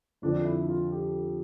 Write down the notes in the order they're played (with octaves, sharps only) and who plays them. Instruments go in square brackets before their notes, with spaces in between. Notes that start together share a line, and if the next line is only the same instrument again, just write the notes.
[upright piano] F2 D3 F3 [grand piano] D4
[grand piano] E4
F4
G4